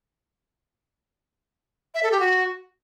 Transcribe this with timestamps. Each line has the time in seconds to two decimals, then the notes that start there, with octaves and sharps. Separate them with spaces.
1.94 E5
2.03 A4
2.11 G4
2.20 F#4